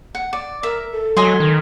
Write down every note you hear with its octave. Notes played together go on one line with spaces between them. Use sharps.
F#5
D5
A#4 E5
A4
F#3 D#5 G#5 C6
D#3